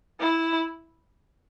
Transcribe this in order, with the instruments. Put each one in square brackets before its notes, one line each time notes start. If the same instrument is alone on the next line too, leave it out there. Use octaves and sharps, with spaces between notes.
[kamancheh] E4